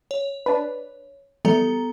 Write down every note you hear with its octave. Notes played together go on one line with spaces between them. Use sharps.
C#5
D4 B4
E3 G3 B3 A4 A#5